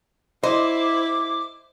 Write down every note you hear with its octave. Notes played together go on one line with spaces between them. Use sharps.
E4 C5 D#5 D6